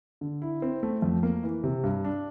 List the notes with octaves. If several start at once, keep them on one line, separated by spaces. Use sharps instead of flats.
D3
E4
C4
A3
F2
A#3
E3
C3
G2
D4